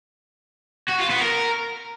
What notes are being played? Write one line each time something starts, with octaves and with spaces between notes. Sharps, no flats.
F#4
F4
B3
A#4